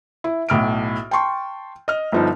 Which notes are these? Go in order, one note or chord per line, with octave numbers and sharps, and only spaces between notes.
E4
B1 A2 F6 D7
G5 A5 C6 C#6
D#5 F6
G1 F3 D#4